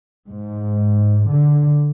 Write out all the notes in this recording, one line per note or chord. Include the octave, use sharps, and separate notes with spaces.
G#2
D3